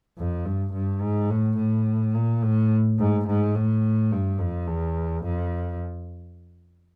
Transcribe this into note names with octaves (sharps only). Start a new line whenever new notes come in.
F2
G2
G2
G#2
A2
A2
A#2
A2
G#2
G#2
A2
G2
F2
E2
F2